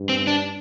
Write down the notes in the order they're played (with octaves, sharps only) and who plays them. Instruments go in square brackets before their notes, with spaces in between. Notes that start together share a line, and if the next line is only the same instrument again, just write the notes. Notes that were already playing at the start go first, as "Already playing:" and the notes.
Already playing: [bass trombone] G2
[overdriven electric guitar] C4
D4